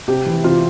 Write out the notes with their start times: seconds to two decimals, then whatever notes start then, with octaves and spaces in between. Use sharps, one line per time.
0.08 C3 G4
0.26 E3
0.44 C3 F4